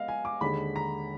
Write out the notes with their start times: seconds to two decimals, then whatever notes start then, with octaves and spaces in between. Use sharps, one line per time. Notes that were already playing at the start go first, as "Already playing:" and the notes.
Already playing: G#3 B3 D#5 F5
0.08 G#5
0.25 D6
0.41 D#2 D3 G#3 B5
0.76 A#5